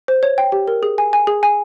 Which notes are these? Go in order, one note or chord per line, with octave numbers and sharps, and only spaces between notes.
C5
C#5
G5
G4
A#4
G#4
G#5
G#5
G#4
G#5